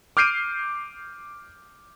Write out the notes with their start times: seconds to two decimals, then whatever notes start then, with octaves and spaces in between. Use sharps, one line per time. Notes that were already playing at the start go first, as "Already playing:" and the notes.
0.17 D6 F6 G6 C7 D7 D#7